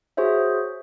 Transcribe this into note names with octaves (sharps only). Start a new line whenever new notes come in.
F#4 G#4 C5 C#5 E5